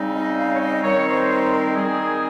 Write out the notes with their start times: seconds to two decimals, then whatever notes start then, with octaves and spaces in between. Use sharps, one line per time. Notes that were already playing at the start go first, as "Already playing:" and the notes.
Already playing: C#3 G3 C4 D#4
0.14 D#5
0.38 F5
0.53 C#5
0.60 D#5
0.83 D#3 G3 C4 D#4 C#5
1.07 C5
1.29 C5
1.52 A#4
1.75 D#3 G3 C4 D#4 G#4